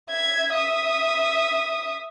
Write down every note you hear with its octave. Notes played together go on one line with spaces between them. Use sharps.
E5 G#6
E5 D#6